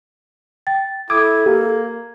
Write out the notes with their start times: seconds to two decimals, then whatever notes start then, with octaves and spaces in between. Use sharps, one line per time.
0.67 G5 A6
1.10 E4 A4 D6 D#6 G#6
1.46 A#3 G4